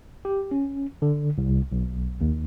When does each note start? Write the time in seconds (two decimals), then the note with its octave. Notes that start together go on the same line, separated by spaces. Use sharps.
0.25 G4
0.51 C#4
1.02 D3
1.38 C2
1.72 B1
2.21 D#2